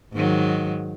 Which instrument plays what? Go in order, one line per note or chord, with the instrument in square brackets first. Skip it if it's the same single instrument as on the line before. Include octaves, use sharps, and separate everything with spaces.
[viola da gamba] G#2 D#3 F#3